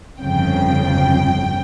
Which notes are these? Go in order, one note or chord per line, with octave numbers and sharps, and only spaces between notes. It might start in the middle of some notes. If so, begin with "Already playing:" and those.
G1 F2 C#3 G5